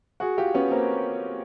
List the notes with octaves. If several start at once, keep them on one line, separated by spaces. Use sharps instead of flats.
F#4 G#4
F4 G4
B3 C#4
A#3 C4